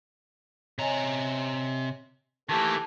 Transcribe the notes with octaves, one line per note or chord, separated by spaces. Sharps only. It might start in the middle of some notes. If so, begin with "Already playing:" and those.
C3 C#5 D#5 G#5 A#5
D#3 E3 A3 A#3 G4 A5